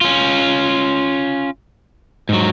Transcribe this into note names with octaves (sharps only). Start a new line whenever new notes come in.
C#4 F4
G#2 F#3